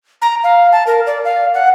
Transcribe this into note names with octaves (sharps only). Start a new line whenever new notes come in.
A#5
F5
A5
A#4
D5
F5
F#5